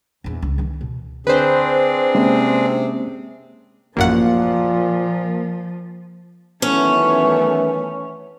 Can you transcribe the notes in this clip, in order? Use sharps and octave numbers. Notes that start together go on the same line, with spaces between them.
A#1 E2
C#2
D#3 E3
B2
D2 C4 D4 G#4 B4 C5
C3 G#3 A#3 C#4
A1 F#2 A#2 F3 A#3 F#5
F#2 D#3 E3 A3 B3 C#4